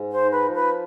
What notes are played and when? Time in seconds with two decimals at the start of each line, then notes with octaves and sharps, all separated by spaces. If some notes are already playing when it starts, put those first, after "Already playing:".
Already playing: G#2
0.11 C5
0.18 D#4
0.32 B4
0.48 F3
0.55 B4